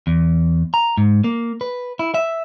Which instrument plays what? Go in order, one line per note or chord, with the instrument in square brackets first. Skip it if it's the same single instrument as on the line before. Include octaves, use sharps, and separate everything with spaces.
[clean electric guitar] E2
A#5
G#2
A#3
B4
E4
E5